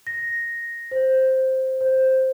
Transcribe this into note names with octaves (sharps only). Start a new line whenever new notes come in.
A#6
C5
C5